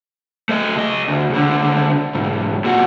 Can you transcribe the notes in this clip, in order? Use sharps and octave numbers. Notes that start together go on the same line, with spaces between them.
A3 D#5
C#2 D#5
D2
C#2 D3
B1 G#2
A#2 F#4